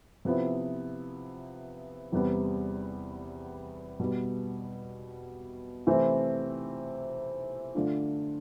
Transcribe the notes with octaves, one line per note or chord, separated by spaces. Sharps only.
C3 F3 B3 E4
E2 C3 G3 B3
B2 G3 B3
C3 E3 A3 C4 E4
D3 A3 D4 F4